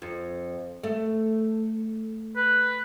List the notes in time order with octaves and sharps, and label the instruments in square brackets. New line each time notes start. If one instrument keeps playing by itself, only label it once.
[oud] F2
A3
[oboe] B4